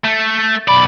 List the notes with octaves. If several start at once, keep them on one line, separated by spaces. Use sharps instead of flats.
A3
B1 D5 B5